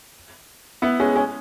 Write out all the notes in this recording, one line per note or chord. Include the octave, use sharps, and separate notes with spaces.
B3 E4
G#3 C#4
G#3 C#4